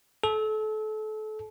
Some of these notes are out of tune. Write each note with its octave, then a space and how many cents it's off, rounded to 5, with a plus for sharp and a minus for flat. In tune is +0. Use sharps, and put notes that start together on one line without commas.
A4 -30